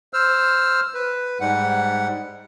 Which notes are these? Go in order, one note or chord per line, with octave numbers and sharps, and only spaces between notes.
C5 E6 F6
B4
G#2 G3 F#5